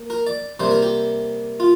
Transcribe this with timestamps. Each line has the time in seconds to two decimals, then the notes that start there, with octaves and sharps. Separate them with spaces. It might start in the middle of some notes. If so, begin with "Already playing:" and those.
Already playing: A#3
0.10 A#4
0.27 D5
0.60 C3 G3 A#3 C5
0.71 A#4
0.82 G4
1.60 F4